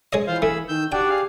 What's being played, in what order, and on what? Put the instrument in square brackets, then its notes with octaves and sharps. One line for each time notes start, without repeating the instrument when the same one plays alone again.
[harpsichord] G#3 C#5 D#5
[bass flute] E3 [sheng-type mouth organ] F4 C5 F5
[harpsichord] A3 [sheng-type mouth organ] G#4 B5 E6
[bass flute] D#3 [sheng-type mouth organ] E6 G6
[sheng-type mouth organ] D4 F#4 D5 [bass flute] G4 [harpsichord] G5
[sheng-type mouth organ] G#4 F5